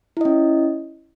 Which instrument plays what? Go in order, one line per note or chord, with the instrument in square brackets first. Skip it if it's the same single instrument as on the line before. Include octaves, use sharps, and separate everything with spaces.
[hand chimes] E4
D#5
C#4